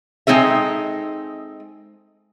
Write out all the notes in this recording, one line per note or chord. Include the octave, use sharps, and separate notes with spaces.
G#3 C4 D#4 A4 E5